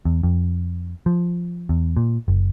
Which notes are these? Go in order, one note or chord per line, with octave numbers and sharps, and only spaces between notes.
E2
F2
F3
E2
A#2
F#1